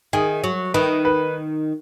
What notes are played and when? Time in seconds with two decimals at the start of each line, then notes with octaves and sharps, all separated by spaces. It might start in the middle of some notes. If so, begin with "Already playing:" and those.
0.13 D#3 G#4
0.44 F#3
0.74 D#3 B4
1.05 B4